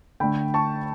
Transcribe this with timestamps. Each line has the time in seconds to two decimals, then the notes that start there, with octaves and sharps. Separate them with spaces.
0.20 D3 A3 G5 B5
0.54 A5 C#6